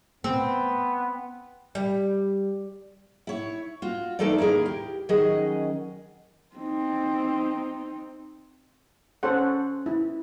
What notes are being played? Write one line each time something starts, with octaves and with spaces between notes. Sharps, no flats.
B3 C4
G3
E4 C#5
F4 F#4
E3 A3 D#4 A4 A#4 D5
D#2 E4 G#4 A#4
G4
D#3 F#3 C#4 G#4 D#5
C4 D#4
C#4 A4 C5 C#5 F#5
E4